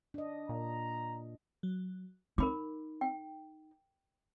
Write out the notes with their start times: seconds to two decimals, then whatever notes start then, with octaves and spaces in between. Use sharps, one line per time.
0.14 D4 D#5
0.49 A#2 A#5
1.63 F#3
2.38 D#4 A#4 B5 D6
3.01 G5